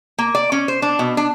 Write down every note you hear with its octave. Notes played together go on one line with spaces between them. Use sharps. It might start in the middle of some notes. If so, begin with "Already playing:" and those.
A#3
D5
C#4
C5
D4
B2
D4